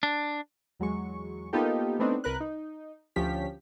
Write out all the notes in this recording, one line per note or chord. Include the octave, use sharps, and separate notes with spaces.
D4
E2 F#3 G#3 C#6
A#3 B3 D#4 F4 G4 A4
A3 B3 C4 D4 D#4
C2 A#4 B4 F#6
D#4
D2 F3 C#4 G4 B6